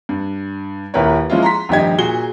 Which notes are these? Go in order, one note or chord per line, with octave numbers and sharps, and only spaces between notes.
G2
D#1 E4 G4 A#4 B4 C#5
F3 G#3 C#4 E4 F4
A#5 C6 B6
A#1 G2 D#3 G4 D#5 G#6
A#2 F#4 G#4 G7